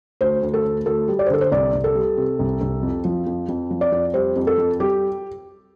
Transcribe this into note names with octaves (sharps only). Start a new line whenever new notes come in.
D2 C5
D2
A4
D2
D2 A4
G3
D5
C5
D3 A4
C5
C2 D5
C2
A4
G3
C3
C2
C2
F2
F3
F2
F2
F3
D5
F2
G3 C5
F2
A4
F2
G3 G4